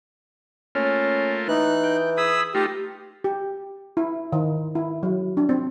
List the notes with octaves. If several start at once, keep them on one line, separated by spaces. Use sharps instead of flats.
A3 A#3 C#4 F4
E3 D#4 F#6
G5
G#4 B5 D#6 E6
A3 D#4 F4 G4
G4
E4
D#3
E4
F#3
D4
C4